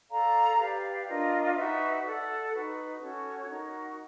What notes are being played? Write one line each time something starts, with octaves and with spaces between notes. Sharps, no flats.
A4 D5 F5 A#5
G4 B4 D5 F5
D4 F4 A#4 D#5
D#4 F#4 B4 E5
A4 D5 F#5
D#4 F#4 B4
C#4 F#4 A4 C#5
D#4 F#4 A#4